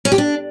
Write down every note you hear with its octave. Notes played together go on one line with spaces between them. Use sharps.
C#4
G4
D4